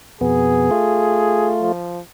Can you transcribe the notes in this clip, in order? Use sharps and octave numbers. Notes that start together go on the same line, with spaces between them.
F2 B2 B3 G#4
A3 F4
F3